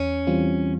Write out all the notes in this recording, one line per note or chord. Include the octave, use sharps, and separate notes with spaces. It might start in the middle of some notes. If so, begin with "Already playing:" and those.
Already playing: E2 C#4
E3 G3 C4 F4